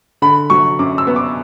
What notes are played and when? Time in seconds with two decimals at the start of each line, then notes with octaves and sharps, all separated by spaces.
0.22 D3 B5
0.50 F#3 C#6
0.79 F#2 D6
0.98 E6
1.07 B3
1.16 D6